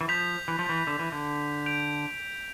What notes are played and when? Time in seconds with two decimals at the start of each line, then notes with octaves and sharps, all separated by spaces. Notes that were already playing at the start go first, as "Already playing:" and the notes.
0.01 E3
0.08 F3 G6 B6 F7
0.48 E3
0.59 F3
0.69 E3
0.87 D3
0.99 E3
1.12 D3
1.66 G6 D7 F7